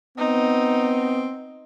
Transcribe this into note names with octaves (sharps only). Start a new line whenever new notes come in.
B3 C4 D#4